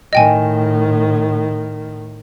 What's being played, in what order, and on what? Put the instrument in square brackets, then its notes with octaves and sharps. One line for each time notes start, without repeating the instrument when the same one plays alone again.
[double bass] A2 D#3 [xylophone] D#5 G5 G#5